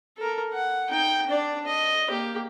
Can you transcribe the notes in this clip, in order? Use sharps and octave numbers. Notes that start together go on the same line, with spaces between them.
A4 A#4
F#5
D#4 G5
D4 D5
D#5
A#3 G4